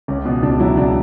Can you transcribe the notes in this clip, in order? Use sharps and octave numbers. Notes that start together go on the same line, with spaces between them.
C#2 C#4
B2
C#2 D4
F#3 E4
C#2 D4